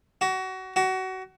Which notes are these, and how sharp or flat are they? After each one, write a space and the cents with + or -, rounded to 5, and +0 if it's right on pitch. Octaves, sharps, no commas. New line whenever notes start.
F#4 +25
F#4 +25